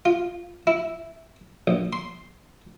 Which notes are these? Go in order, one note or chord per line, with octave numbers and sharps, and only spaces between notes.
F4
E4
A#1
C6